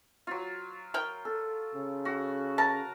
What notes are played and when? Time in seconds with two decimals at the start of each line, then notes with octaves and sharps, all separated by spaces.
0.27 F#3 F4
0.94 A#4 G5
1.25 A4
1.75 C#3
2.05 F#4
2.58 A#4 A5